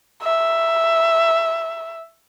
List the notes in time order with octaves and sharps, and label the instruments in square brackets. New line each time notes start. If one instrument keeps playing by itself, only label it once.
[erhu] E5